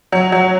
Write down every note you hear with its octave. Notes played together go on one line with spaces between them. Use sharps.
F#3
F#3